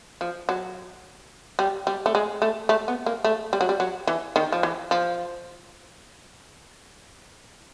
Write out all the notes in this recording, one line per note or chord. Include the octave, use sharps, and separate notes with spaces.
F3
F#3
G3
G3
A3
G#3
A3
A3
B3
A#3
A3
G3
F#3
G3
F#3
E3
D#3
F3
E3
F3